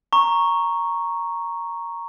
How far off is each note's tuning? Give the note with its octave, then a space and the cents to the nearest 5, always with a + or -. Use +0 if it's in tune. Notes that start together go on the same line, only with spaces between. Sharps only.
A#5 +0 C#6 +0